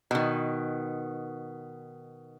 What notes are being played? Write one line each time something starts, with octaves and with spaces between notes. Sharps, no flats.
B2 D#3